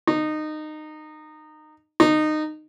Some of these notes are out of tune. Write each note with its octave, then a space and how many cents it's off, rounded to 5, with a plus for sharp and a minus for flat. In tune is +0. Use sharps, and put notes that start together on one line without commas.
D#4 -20
D#4 -20